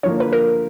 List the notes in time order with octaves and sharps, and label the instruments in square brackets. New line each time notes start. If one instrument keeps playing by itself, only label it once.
[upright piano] D3 F3 A#3 [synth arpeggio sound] C#5
[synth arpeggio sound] B4
A#4